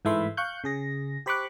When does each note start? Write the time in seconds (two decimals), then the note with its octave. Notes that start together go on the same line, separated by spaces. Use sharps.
0.05 G#2 E3 A3 E5 B5 C6
0.37 F5 C#6 F#6 G6
0.64 C#3 G#4 A#6
1.26 G4 C5 B5 C#6 D6 F#6